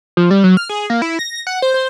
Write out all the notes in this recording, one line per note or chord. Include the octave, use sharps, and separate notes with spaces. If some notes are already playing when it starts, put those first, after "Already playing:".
F3
G3
F#3
F6
G#4
A#3
E4
A#6
F#5
C5
C5